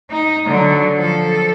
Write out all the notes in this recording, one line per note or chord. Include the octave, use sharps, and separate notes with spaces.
D#4
D3 F#3
F3 A4